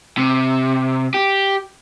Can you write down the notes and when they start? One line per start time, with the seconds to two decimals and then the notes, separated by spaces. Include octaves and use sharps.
0.18 C3
1.14 G4